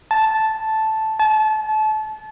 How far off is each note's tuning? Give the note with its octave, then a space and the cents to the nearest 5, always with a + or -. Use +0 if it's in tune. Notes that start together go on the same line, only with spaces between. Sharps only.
A5 -5
A5 -30